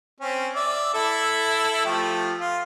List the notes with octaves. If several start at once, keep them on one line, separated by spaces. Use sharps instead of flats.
C4 C#4
D5 E5
E4 A4 E5
F3 A3 G4
F4